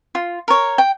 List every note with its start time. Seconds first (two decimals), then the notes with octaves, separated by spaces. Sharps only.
0.15 F4
0.48 A#4 C#5
0.78 G5